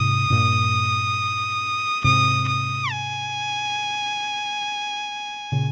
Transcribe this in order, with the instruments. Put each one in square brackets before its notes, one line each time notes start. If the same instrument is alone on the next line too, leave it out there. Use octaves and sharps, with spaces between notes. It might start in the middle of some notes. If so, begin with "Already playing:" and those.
Already playing: [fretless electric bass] G#2 C3 [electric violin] D#6
[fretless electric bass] G2 A#2
[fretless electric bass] G#2 C3 [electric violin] D#6
[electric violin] D#6
G#5
[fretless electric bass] A#2 C#3